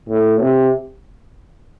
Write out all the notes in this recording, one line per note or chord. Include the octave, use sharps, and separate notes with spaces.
A2
C3